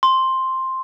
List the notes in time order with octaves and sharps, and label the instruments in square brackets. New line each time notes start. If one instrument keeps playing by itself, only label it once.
[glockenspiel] C6